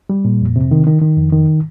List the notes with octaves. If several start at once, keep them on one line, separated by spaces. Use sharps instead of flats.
G3
A#2
F2
C3
D#3
D#3
D#3
F2
D#3